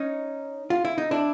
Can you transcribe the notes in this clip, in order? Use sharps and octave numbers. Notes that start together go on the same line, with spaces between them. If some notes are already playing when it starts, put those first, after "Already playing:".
Already playing: C#4 D#4
F4
E4
D#4
D4 E4